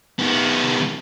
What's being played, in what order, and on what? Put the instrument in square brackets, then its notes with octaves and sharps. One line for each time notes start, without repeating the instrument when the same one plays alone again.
[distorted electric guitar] D#3 B3